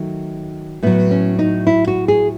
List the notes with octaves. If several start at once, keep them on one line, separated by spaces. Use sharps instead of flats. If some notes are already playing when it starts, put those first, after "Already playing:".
Already playing: D#3 F#3 A3
A2 F#3 B3
C#4
D#4
E4
F#4
G#4